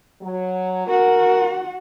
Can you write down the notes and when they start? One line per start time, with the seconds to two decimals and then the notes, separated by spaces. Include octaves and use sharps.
0.21 F#3
0.87 F#4 A#4 F#5